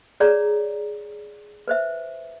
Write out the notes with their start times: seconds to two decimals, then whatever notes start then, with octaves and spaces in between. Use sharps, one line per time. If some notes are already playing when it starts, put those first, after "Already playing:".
0.20 G#4 C#5 D5 A#5
1.68 B4 C5 E5